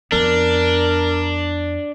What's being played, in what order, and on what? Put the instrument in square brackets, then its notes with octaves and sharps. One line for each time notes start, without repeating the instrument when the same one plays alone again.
[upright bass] F2 B3 [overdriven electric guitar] D4 [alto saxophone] A#4